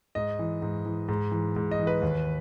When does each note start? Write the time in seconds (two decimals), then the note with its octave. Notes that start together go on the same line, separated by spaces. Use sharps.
0.15 G#2 D#5
0.39 E3
0.62 G#2
0.86 E3
1.08 G#2
1.32 E3
1.56 G#2
1.71 D#5
1.79 E3
1.87 B4
2.02 D#2